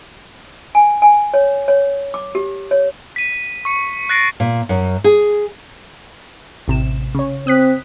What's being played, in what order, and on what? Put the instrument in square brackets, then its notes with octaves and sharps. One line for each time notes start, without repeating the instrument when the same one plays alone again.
[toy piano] G#5
G#5
C#5
C#5
D6
G4
C#5
[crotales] B6 D#7
C#6 C#7
F#6 A6 A#6 C7 D7
[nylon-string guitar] A#2
F#2
G#4
[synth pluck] A1 C3 E7
C#3 C#5
[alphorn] C4 [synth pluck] D#6 F#6 B6